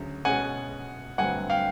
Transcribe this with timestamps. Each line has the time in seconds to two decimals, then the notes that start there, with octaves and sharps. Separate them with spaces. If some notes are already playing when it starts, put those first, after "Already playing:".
Already playing: D2 C#3 F#3
0.25 B2 G#3 C#4 F#5 G#5
1.18 G2 D3 F#3 A3 C4 F#5 G#5
1.50 F5 G5